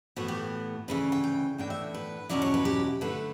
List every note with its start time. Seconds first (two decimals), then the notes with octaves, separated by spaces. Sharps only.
0.16 A2 E3 B3 F#4
0.28 G4
0.88 D2 C#3 E3 B4
1.12 G5
1.24 G5
1.58 A2 E3 B3 D4 G5
1.70 E5
1.94 B4
2.29 E2 B2 F#3 C#4 E4 D5
2.42 C#5
2.54 B4
2.65 G4
3.01 D3 A3 E4 B4